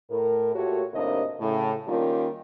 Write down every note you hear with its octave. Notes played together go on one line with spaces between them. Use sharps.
A2 A#4
A#2 A3 F#4 G4 C#5
D#2 A2 C3 A#3 D4 D#5
A2 C#3
D#3 G3 A#3 C#4 F4